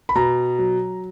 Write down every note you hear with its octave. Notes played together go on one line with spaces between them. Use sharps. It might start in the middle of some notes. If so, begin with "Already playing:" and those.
B5
B2 A#5
F#3